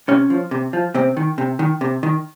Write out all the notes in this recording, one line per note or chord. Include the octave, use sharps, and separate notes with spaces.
C3 C#4
F3
C3
F3
C3 C4
D#3
C3
D#3
C3
D#3